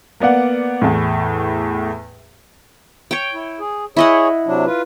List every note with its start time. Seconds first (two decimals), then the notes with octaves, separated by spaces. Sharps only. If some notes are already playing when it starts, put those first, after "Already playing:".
0.20 A#3 B3 D5 F#5
0.82 E2 A2
3.11 C#5 G5
3.34 E4
3.59 G#4
3.97 E4 G#4 C#5 D#5 F#5
4.46 C3 F#3 D4
4.66 F4 B4